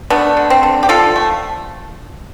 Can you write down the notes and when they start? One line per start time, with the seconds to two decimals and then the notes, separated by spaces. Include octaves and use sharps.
0.10 A3 B3 D4
0.37 D3
0.50 C4
0.63 D3
0.83 G4
0.89 F3 F4 A4
1.16 A3